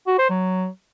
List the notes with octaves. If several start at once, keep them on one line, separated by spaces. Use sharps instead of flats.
F#4
C5
F#3